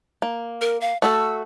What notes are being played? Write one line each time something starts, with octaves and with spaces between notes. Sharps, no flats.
A#3
A#4
F5
A3 F#4 A4 E6